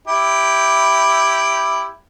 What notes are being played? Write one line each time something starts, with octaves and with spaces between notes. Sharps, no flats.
E4 G4